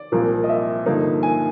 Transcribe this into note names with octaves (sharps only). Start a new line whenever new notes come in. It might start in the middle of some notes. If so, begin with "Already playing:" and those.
Already playing: D5
C2 A#2 F3 A#3
D#5
E5
G2 D3 F3 A#3 D#4
G#5